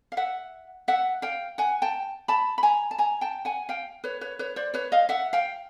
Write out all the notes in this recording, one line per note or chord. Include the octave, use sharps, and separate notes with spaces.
F5
E5 F#5
E5 F#5
F5 G5
F#5 G#5
G5 A5
A5 B5
B5
G#5 A#5
A5
G#5 A#5
G5 A5
F#5 G#5
F5 G5
B4 C#5
B4 C#5
B4 C#5
C5 D5
B4 C#5
D#5 F5
E5 F#5
F5 G5